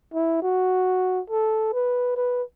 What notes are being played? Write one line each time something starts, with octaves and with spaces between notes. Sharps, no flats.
E4
F#4
A4
B4
B4